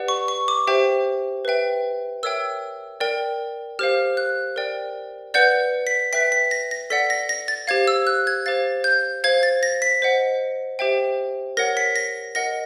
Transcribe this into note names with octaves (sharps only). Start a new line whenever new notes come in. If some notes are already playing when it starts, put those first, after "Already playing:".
Already playing: G4 B4 D5 F#5
C#6
C#6
D6
G4 C5 E5 G5
B4 E5 G5
A#4 C#5 E5 G5 E6
A#4 D5 G5
G4 C5 F5 F6
F#6
A#4 D5 G5
B4 D5 F#5 G6
B6
B4 E5 G5 B6
B6
A#6
A#6
A4 D5 F#5 B6
A#6
A#6
A6
G4 C5 F5 G#6
E6
F#6
G#6
G4 C5 F5 A6
G6
C5 F5 G#6
A6
A#6
B6
C5 D#5 F#5
G4 C5 E5 G5
A#4 C#5 F#5 A#6
B6
A#6
A#4 D#5 F#5 A#6